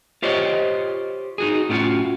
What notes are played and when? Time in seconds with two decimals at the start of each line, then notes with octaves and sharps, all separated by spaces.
0.22 F4 G4 C5 C#5 D#5
1.38 D#4 F#4 G#4
1.69 A2 A3 C#4 D#4 F4 F#4